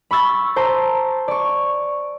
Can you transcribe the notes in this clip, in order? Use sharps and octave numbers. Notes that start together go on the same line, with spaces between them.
B5 C#6 E6 A6
C5 A5 A#5
D5 C#6